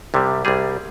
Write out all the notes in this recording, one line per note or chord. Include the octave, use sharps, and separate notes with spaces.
C2 C3 G3
C2 C3 G3 G#4